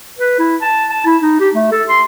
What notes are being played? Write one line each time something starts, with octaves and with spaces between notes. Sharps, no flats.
B4
E4
A5
A5
E4
D#4
G4
A3
A4
C6